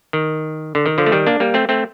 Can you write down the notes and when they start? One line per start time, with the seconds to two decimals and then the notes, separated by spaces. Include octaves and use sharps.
0.13 D#3
0.75 D3
0.86 D#3
0.98 D3 F3
1.06 A3
1.12 D#3 G3
1.27 A#3 D4
1.40 G3 A#3
1.54 A3 C4
1.69 A3 C4